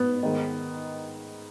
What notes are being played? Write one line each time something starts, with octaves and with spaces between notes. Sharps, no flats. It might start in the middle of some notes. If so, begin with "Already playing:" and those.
Already playing: B3
G#2 D#3